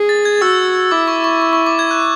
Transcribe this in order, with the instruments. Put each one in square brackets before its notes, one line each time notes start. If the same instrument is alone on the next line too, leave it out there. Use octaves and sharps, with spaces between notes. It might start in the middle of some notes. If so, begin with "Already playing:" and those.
Already playing: [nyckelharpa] G#4
[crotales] A6
G#6
[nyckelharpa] F#4 [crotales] E6
[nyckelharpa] E4 [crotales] D6
[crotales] C#6
C#6
C#6
C#6
D6
G#6
F#6